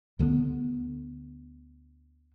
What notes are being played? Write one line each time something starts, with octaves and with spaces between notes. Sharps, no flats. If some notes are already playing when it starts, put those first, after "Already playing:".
D2 D3 F#3 B3